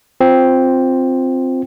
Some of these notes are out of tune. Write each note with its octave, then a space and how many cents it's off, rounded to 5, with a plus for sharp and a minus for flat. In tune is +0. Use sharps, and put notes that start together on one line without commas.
C4 +0 F4 +5